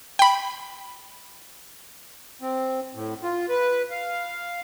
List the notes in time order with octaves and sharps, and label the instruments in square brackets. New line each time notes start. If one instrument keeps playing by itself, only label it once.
[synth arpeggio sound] G5 B5
[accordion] C4
A2
F4
B4
F5